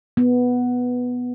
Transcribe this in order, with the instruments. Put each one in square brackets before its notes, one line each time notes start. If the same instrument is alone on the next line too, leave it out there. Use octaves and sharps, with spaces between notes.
[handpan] B3